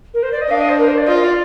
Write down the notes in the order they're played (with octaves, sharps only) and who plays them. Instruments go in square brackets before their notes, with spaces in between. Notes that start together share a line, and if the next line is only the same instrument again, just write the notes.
[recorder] A#4
C5
D5
D#5
[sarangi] D4 [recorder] F5
[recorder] D#5
C5
A#4
C5
D5
[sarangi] F4 [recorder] D#5
[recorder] D5